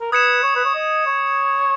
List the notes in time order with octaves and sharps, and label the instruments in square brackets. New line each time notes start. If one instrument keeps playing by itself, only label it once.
[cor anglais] A#4
[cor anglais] B4 [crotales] D#6 G#6 C#7 E7
[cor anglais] C#5
B4
C#5
D#5
C#5